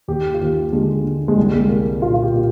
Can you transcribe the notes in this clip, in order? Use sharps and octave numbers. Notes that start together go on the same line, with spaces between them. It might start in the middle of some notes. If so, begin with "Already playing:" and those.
D#2 G4
F4
D#2 G4
D3 G#3
D3
G#3
C2 G3
G#3
C2 A#3
A#2 F4
F4
G4
A#2